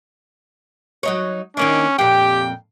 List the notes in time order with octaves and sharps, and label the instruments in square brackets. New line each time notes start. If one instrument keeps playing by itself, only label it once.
[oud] F#3 D#4 C#5
[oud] D#3 A#3 D4 [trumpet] C#4
[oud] F2 A#2 [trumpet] G4 [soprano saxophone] G5